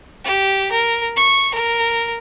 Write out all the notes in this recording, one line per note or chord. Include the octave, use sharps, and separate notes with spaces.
G4
A#4
C#6
A#4